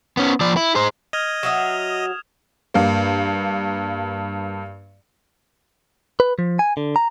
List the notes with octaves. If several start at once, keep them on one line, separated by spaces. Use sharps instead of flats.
B3 C#4
F3 D5
E4
G#4 C5
D#5 F6 G#6 F7
F#3 F#4 E5 D#6 E7
G2 A#3
B4
F3
G#5
D3
A#5